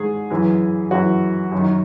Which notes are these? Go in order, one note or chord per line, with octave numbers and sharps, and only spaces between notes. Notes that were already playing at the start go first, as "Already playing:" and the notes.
Already playing: G#2 D#3 G#4
F#2 E3
F#2 E3 F#4
F#2
D#3